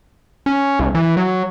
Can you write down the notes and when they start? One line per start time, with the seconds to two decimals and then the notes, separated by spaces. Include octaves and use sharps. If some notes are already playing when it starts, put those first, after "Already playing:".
0.46 C#4
0.79 C2
0.95 E3
1.17 F#3